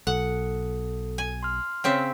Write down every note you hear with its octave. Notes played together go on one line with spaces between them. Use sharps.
B1 A4 F#5
G#5
C6 F6
C#3 C4 E5